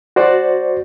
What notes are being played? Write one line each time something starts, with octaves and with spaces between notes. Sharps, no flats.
F#4 C5 D5